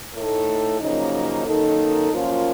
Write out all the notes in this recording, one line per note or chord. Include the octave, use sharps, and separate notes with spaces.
A2 A3 D#4 A4
F#2 C#3 F3 A#3 D#4
F#2 D#3 A#3 D#4 A4
F#2 F3 A#3 C#4 F4